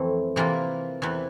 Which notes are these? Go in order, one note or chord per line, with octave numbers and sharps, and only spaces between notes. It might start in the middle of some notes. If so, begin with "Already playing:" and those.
Already playing: F2 E3 A3 C4
C3 E3 A#3 F4
E2 C3 E3